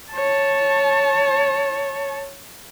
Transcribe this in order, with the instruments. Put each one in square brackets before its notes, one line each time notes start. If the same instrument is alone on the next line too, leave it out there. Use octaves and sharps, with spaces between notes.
[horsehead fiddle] C#5 A5